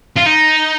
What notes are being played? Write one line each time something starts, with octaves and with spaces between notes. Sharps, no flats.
F4
D#4